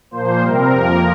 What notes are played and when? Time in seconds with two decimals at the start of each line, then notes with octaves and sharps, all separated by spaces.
0.11 A#2 F3 A#3 C5
0.41 C3 G3 C4 A#4
0.72 F2 F3 A#3